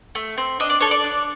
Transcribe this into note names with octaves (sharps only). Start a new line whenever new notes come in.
A3
C4
D4 D#5
D5
A4 C#5
D5
D4